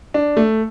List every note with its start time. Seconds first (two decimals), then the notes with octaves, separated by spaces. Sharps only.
0.14 D4
0.37 A3